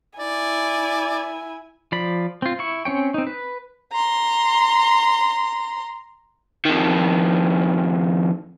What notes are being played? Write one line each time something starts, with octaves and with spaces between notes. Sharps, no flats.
E4 D5 G#5
F3 D5 B5
C4 F4
E4 C#6
C4 C#4 C#5 G5
C4 D#4
B4
A#5 C6
F2 D#3